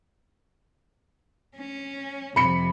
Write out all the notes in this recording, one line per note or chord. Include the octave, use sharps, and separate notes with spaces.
C#4
F2 C3 B5 C#7